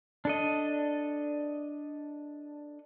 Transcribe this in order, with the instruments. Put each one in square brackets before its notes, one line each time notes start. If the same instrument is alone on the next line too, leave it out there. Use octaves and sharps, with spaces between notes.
[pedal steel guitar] D4 A4 D#5